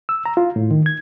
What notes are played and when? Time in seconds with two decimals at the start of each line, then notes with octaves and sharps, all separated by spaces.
0.09 E6
0.26 A#5
0.37 F4
0.56 A2
0.71 D#3
0.86 G#6